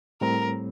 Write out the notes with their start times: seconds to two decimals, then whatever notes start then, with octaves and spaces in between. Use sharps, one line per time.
0.21 A2 G3 C4 A#4